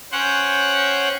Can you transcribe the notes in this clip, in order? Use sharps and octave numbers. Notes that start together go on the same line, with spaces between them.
C#4 C5 F#5 G5